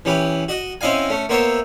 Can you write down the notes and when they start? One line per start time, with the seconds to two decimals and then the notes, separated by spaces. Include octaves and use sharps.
0.05 E3 C#4 G4 B4
0.49 F#4 D#5
0.81 C4 C#4 E4 D#5 F5 G#5
1.10 A3 C#4
1.29 A#3 B3 C5 C#5 E5